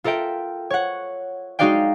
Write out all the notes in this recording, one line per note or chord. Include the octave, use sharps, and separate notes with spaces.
F4 A4 A#4 E5 G5
C#5 F#5
G#3 D#4 F#4 D5 F5 G5